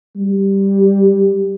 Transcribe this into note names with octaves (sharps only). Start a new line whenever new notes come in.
G3